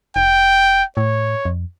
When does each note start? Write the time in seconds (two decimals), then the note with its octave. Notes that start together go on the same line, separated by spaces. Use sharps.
0.16 F1 G5
0.97 A2 C#5
1.45 F2